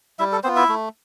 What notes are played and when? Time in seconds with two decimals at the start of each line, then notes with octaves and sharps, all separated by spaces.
0.19 G3 E4 E5
0.32 A4
0.44 B3 C4 F4 C5
0.56 E4 E5
0.69 A3